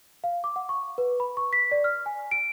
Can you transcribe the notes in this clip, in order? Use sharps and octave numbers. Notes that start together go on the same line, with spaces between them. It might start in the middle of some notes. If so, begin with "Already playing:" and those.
F5
D6
F#5
C#6
B4
B5
C#6
B6
D5
F6
G#5
D7